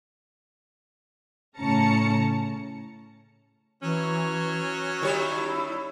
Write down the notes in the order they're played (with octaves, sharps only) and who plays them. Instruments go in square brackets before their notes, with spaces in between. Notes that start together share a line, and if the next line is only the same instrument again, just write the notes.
[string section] A2 C#3 C#4 A5 A#5 C#7
[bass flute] E3 [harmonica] F#3 [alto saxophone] C#4
[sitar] D#3 G3 C#5 [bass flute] E4